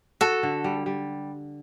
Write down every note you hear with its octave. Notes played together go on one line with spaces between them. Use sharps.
F#4 A4
D3
G3
G3